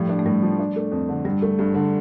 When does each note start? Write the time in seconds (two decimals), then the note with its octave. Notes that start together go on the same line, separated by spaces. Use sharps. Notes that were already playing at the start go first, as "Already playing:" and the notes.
Already playing: A2 F3 G3
0.09 D4
0.19 A3
0.25 A2 G3
0.42 F3
0.59 D4
0.76 A3
0.91 F2
1.09 D3
1.25 G2 G3
1.42 A3
1.59 G2
1.74 D3